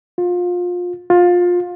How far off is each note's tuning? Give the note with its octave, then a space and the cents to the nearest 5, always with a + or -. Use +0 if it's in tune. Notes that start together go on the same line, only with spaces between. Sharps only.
F4 +25
F4 +20